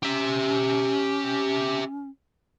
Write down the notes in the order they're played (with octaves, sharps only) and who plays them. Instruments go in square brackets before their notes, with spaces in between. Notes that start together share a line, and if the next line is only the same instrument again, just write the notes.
[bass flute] C#4 [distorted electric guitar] G4 E5